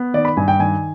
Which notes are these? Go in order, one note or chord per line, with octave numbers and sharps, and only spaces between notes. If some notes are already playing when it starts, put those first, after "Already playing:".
Already playing: B3
D#3 D5
B5
G2 G#5
G5
D#3 G#5